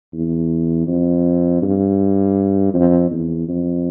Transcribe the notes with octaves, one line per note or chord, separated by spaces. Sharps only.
E2
F2
G2
F2
E2
F2